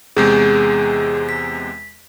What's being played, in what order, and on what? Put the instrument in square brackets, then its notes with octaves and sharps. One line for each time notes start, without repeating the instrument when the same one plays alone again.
[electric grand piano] E2 C3 G#3 [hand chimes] G#4 G6
[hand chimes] B6